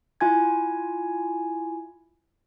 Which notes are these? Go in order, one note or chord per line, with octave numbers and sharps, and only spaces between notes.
E4 F4 G#5 G#6